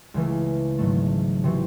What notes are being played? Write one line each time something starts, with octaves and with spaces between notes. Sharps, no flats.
C#2 C#3 E3 A3
G#1 G#2 F#3 A3
C3 E3 C4 F#4